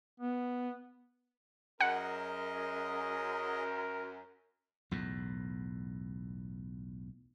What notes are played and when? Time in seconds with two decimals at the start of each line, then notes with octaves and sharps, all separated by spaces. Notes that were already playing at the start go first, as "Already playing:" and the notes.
0.20 B3
1.81 F#2 G#4 A#4 D#5 F#5
4.91 B1 E2 A2